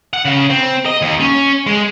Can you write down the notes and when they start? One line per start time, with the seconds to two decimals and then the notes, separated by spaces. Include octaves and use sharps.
0.13 F#5
0.25 C#3
0.50 C4
0.86 D#5
1.02 D#2
1.20 C#4
1.67 G#3